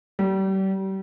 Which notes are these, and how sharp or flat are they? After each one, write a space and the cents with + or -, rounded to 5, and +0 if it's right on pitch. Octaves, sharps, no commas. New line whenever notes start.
G3 -35